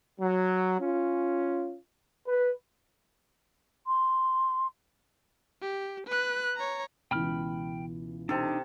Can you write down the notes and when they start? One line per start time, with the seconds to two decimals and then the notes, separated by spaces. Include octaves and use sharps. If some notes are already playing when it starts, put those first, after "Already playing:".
0.20 F#3
0.80 C#4 F4
2.27 B4
3.87 C6
5.62 G4
6.07 B4 F#6
6.56 C#5 A#5
7.11 C#2 B2 E3 G5 B5 F6
8.29 C3 D4 D#4 A4